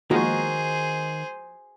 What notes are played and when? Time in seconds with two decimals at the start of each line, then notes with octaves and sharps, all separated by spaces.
0.11 D#3 F3 G#3 A#3 D#4 F#4 G#4 C5